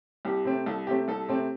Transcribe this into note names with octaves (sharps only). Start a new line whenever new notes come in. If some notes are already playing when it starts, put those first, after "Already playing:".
C2 G4
C3 A3 C4
C2 A4
C3 A3 C4 G4
C2 A4
C3 A3 C4